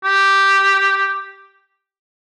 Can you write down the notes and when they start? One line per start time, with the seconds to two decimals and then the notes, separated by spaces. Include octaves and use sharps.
0.04 G4